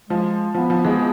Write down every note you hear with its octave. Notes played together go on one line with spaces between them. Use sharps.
F3 G#3
F3 B3
F3
E3 G#3